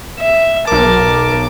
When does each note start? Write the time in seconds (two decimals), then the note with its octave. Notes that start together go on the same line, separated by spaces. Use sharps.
0.19 E5
0.67 B1 A#4 A5 D6